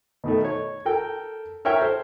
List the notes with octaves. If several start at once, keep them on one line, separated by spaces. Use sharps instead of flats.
B2 D#3 A3
C#5
A4 A#4 G5
A#4 C#5 E5 G5 F6
A4 C5